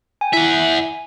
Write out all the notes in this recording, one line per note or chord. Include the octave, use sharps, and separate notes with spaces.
G5 G#5
E4 E5 F#5